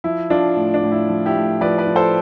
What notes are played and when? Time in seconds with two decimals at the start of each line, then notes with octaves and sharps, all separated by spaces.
0.04 F3 E4
0.30 F3 D4 F4
0.56 A2
0.74 D4
0.83 A2
0.91 E4
1.09 F3
1.26 E4 G4
1.35 A2
1.61 F3 B4 D5
1.78 B4 D5
1.87 F3
1.96 A4 C5